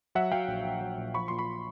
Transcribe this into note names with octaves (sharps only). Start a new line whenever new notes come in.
F#3 E5 F#5
F#3 F5 G5
A#1
A#1
F#3
A#2
F3 B5 C#6
A#2 C6
B5 C#6